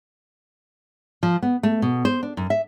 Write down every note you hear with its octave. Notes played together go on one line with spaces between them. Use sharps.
F3
B3
A3
B2
C5
D4
F#2
E5